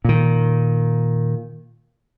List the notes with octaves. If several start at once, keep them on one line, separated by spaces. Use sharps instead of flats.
A#2 D#3